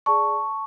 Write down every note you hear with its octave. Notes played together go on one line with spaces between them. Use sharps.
G#4 D5 A5 C#6